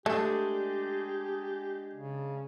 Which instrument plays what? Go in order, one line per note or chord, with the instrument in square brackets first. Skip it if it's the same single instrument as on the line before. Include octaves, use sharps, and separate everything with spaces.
[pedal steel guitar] G#3 D4 G#4 [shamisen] A3 [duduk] G4
[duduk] C#3